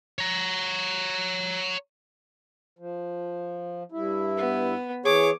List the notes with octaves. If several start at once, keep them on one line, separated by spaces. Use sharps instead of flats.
C#5 A#5
F3
G2 E4
B3
E3 G#4 C#5 D6